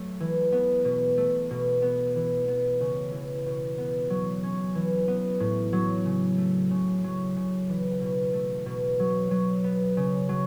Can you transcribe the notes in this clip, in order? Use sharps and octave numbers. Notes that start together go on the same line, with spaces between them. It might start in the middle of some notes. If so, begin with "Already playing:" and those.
Already playing: F#3 A3
E3
B3
B2
A3
B2
B3
E3
B3
C#3
E3
B2
B3
F#3
C#4
E3
B3
A2
F#3
C#3
A3
C#3
F#3
C#3
E3
B2
A3
B2
F#3
F#3
B3
C#3
F#3